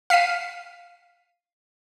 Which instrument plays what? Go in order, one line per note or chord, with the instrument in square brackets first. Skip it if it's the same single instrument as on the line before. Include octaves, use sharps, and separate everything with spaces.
[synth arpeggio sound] F5 B6 C7 D#7